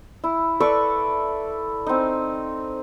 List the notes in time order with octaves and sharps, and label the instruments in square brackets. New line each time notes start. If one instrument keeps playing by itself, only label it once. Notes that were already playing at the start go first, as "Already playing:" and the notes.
[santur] E4
A4 B4 D5 C#6
C4 D#4